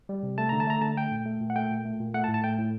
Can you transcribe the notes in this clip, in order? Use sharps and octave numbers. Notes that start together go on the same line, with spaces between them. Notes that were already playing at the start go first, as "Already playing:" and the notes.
G3
C3
A3 A5
D3 A#5
A5
A3 A#5
D3 A5
A3 G5
A#2
A3
A#2
F#5
A3 G5
A#2
A3
A#2
A3 F#5
A5
A2
A5
A3 G5
A2